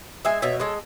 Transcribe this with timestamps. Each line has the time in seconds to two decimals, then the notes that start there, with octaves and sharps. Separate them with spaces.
0.25 G#3 E5 G#5
0.42 B2 C#5 E5
0.60 G#3 A4 C#5